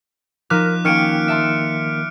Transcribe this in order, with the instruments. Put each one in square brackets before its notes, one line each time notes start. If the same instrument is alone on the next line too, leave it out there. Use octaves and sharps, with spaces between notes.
[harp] F3 D#4 [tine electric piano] A#4 F6 [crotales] D6 F#6 B6
[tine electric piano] D#3 A#3 [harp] C#4 G5 [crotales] F6 C#7 D7
[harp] E5 A5 C6